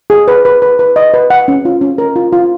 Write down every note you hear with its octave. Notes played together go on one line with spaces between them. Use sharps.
G#4
B4
B4
B4
B4
D#5
B4
F#5
C#4
F4
C#4
A#4
F4
F4